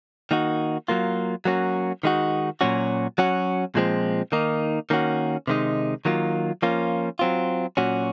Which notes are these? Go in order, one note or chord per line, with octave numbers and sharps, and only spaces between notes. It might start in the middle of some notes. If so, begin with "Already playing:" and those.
D#3 A#3 D#4 F#4
F#3 A#3 F4
F#3 A#3 C#4 F#4
D#3 G#3 D#4 F#4
A#2 F#3 C#4 F#4
F#3 C#4 F#4
A#2 F3 G#3 C4
D#3 A#3 D#4
D#3 A#3 C#4 F#4
C3 D#3 G#3 D#4
D#3 F#3 A#3 F4
F3 A#3 C#4 F4
F#3 C4 F4
A#2 F#3 C#4 F#4